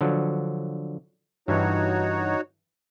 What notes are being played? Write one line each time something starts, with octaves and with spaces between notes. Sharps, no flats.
D3 F3 F#3
G2 E3 D#4 F#4 C#5